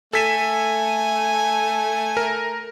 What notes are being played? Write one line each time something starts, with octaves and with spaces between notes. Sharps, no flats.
A3 A4 G#5 B6 E7
A#4